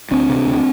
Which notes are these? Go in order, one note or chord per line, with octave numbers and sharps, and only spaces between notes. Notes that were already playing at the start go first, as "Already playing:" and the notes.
D2 C4 D4
C3
D2